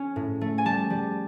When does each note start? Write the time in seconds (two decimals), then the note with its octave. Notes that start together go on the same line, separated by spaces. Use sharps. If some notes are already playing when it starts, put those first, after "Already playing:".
Already playing: C#4 G#5
0.16 A2
0.41 A3
0.58 G#5
0.65 G3 A5
0.90 G3